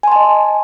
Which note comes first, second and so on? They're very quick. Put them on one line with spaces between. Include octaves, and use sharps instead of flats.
G#5 C6 A5 D#5